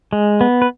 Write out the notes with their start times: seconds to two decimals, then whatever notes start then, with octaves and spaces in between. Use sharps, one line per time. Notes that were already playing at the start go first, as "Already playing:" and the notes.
0.13 G#3
0.41 B3
0.62 B4